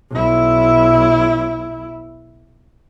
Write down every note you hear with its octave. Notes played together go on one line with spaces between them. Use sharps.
B1 E4